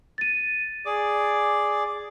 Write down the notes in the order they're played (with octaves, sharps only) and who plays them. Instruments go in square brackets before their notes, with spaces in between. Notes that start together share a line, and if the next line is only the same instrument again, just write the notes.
[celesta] A6 D#7
[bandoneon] G#4 D5 D6